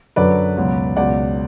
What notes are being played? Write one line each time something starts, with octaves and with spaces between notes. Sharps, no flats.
F#2 D3 F#3 B4 D5
C#2 B2 F#3
C#2 B2 F#3 D5 F#5